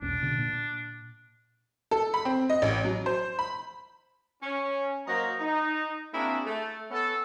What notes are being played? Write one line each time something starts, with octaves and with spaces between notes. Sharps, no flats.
E1 B1 C#4 D4
B2 D3
A#2
A4
B5
C4
D#5
A1
F#3
C5
B5
C#4
F#3 A#3 C5 D#5 A#5
D#4
A#3 C4 D4 E4 F#4 G#4
A3
B3 C#4 A4